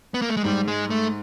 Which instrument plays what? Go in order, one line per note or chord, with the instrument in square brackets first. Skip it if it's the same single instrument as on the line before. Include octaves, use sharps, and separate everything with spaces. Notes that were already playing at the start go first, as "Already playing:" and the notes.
[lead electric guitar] B3
A#3
A3
G#3
[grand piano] G#2 [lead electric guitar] G3
[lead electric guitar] G#3
A3